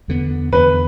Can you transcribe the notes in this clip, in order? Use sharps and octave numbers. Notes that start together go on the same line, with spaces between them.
E2 D3 B3
E2 D3 B3 B4